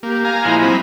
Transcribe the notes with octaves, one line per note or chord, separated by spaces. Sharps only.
A#3 G4
F5 G#5 A#5
A#2 F3 G#3 E4
F#3 C4 B5